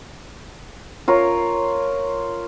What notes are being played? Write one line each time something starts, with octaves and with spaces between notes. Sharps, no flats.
F4 A#4 C#5